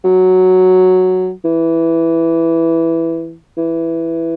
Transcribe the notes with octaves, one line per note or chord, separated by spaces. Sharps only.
F#3
E3
E3